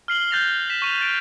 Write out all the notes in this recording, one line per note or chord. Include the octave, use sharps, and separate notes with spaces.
F6 C7 F#7 G7
F#6 G6 A6 A#6 C7 F7
B6 E7
C#6 D#7 F7
A6 D7